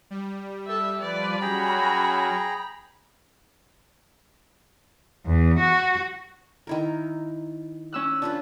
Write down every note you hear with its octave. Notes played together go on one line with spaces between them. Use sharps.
G3
A4 E5
F3 B4 D5
F#3 C#4 F#4 G#4 G5 A#5 B5
E2
F#4
D#3 E4 A#4
C#4 E6 F#6
D4 F4 B4